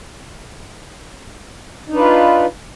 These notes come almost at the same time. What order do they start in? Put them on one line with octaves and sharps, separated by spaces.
D#4 D4 B4 F4